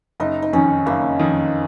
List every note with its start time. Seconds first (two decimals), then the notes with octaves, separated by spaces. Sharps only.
0.20 F#1 D#4
0.42 D#4
0.53 F2 D#3 C#4
0.86 F#1 A#3
1.19 F2 D#3